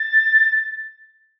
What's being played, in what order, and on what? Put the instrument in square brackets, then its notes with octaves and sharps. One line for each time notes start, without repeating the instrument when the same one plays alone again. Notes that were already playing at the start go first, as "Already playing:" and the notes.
Already playing: [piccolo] A6